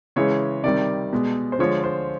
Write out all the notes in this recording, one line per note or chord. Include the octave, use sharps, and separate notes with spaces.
C#3 E3 G#3 C#5
C3 D#3 G3 D5
B2 G#3
C5
D3 F3 G#3 C#5
C5